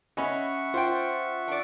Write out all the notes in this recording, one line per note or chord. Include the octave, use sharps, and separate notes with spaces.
C#4 A4 D#5 E5 F#5 G#5 B5 C#6
F4 C5 G5
D4 D5